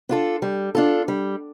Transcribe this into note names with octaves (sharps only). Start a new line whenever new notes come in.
D4 F4 A4
G3
D4 F4 A4
G3